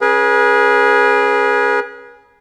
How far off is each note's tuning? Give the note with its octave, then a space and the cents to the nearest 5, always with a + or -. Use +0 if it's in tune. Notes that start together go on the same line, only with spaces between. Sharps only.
C#4 -30 G#4 +0 B4 -40